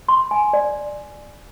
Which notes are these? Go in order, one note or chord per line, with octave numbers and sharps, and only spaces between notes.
C6
G#5
D5